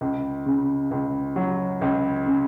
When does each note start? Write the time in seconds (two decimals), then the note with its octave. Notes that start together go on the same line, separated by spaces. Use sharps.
0.01 C#2
0.46 C#3
0.91 C#2
1.36 F#3
1.81 C#2
2.26 C#3